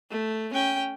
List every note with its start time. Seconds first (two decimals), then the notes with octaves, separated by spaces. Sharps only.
0.11 A3
0.53 C#4 G5